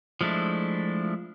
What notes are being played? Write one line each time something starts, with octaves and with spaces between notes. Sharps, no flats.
F3 G#3 A3 D4 E4